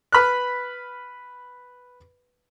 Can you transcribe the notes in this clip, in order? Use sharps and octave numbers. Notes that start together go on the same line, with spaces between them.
B4 B5 F6 F#6